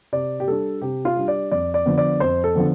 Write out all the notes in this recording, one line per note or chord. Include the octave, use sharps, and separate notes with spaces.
C3 D5
G4
G3 D4 A4
C3 G4
F4
G3 D4
D5
F2 D5
D5
D3 F3 B3
D5
F2 C5
A4
D3 F3 B3